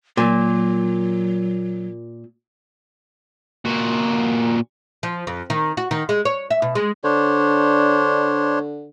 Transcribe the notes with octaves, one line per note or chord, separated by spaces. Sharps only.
A#2 F#3
A#2 F#4
F3
F2
D#3
F#4
D#3
G#3
C#5
E5
B2
G#3
D3 D4 C5 C#5